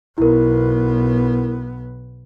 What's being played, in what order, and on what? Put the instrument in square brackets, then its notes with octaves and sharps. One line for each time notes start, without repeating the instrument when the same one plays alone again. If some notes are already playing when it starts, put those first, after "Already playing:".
[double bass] B1 B3 [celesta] E4 A#4